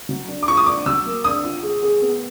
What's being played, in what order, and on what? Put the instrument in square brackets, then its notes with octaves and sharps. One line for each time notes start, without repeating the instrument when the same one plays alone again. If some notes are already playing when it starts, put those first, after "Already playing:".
[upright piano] F#3
D4
[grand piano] D6
[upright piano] F4 [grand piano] C#6
[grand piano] D#6
[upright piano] D4 [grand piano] D6
[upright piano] F#3 [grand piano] E6
[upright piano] A#3
[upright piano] D4 [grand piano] D#6
[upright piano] F4
G#4
G#4
B3